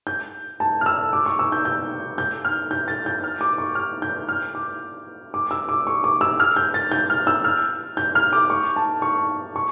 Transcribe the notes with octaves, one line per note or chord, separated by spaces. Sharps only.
G6
A5
F6
E6
D6
C#6
E6
G6
G6
G6
F6
G6
A6
G6
F6
D6
C#6
F6
G6
F6
D6
D6
E6
D6
C#6
D6
E6
F6
G6
A6
G6
F6
E6
F6
G6
F6
D6
C#6
A5
C#6
C#6